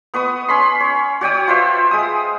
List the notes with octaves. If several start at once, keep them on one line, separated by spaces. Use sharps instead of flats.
B3 B4 C#6 D#6
C#4 B5 C6
C#5
F#4 C#5 G5 D#6
F4 B4 C5 E5
G#3 D#6